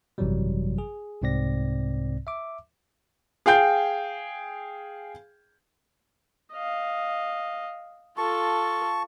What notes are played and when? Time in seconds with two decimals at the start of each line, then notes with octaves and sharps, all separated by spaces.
0.18 G#1 F#2 C3 E3 F#3 G3
0.78 G#4
1.22 C2 G#2 C3 C4 D5 A#6
2.27 E5 D6
3.46 G#4 F5 G5 G6
6.53 D#5 F5
8.17 F4 A4 A5 C#6